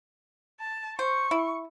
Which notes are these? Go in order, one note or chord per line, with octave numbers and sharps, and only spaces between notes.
A5
C5 C#6
E4